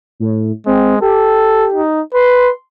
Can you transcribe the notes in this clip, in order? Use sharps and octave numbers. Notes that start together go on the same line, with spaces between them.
A2
G#3 C4
G4 A4
D#4
B4 C6